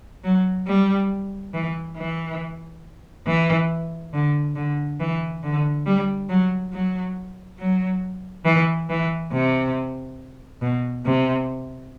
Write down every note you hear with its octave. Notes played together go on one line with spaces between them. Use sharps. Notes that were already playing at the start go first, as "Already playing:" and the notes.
F#3
G3
E3
E3
E3
D3
D3
E3
D3
G3
F#3
F#3
F#3
E3
E3
C3
B2
C3